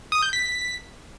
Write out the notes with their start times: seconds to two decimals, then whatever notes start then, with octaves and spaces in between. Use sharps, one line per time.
0.12 D#6
0.23 G6
0.33 B6